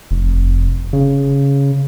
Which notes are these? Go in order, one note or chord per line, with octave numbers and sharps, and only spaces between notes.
F1
C#3